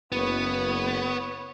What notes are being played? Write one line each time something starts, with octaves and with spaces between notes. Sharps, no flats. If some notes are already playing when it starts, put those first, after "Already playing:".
F#1 B3 B4 C#5